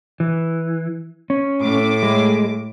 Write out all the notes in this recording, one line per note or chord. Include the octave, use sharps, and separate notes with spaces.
E3
C#4
A2 D6
G#3